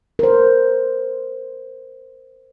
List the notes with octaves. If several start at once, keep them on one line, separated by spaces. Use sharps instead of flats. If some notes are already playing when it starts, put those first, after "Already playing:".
A#4 C5